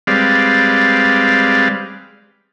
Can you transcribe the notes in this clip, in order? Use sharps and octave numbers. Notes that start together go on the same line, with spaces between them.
G3 G#3 C4 B4 D5 F5